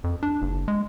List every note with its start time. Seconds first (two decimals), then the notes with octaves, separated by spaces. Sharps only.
0.04 F2
0.23 D4
0.42 F#1
0.68 G#3